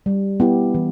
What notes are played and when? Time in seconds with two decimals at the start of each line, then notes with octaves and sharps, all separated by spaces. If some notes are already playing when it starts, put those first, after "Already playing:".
0.06 G3
0.40 B3 E4 G4
0.75 E3